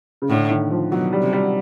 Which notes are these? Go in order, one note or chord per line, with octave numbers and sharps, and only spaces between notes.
C#3
A2 D3
D#3
F3
B2 F#3
G3
C3
G3